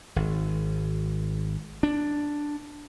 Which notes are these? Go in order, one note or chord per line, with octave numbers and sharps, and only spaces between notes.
G#1
D4